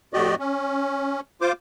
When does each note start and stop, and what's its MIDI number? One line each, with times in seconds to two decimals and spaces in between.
0.13 0.35 41
0.13 0.35 45
0.13 0.35 66
0.13 0.35 67
0.13 0.35 74
0.13 0.35 75
0.39 1.20 61
1.41 1.52 65
1.41 1.52 72
1.41 1.52 86